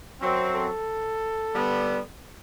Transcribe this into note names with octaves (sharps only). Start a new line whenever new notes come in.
F#2 F#3 C4
A4
D3 G3 B3